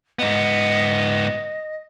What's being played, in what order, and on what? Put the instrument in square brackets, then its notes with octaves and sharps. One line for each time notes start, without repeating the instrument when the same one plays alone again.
[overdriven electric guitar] G#2 B3 [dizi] D#5